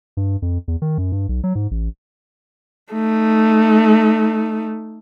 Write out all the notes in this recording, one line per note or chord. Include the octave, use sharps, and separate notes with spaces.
G2
F2
E2
D#3
F#2
G2
B1
F#3
G#2
A1
A3 D#4